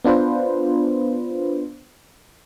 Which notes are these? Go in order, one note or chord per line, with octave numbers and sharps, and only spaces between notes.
B3 D4 F4 B4 C5